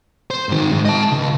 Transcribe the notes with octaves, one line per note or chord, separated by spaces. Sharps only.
C5
G#2 D#3
G#2
D#5 A5
C#2